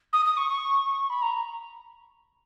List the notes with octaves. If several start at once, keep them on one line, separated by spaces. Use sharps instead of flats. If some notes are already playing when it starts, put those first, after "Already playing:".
D#6
D#6
C#6
C#6
B5
A#5